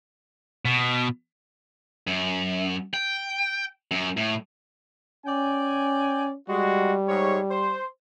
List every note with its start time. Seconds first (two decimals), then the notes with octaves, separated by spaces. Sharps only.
0.65 B2
2.07 F#2
2.94 G5
3.91 F#2
4.17 A2
5.26 C#4 D5 G5 G#5
6.49 G3 G#3 F#4
7.08 G#2 C#5
7.51 C5